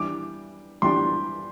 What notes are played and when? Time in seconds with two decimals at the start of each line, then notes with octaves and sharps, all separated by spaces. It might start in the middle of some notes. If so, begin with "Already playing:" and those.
Already playing: E3 G3 D4 D6
0.82 E3 G3 D4 G4 C6